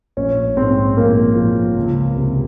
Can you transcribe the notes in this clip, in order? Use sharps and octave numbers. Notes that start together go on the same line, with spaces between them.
A#1 C#4
G#2 C4
A#1 A#3
F3
C#2
C3